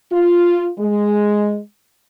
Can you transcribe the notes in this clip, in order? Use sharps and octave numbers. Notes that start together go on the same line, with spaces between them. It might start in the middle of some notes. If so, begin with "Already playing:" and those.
F4
G#3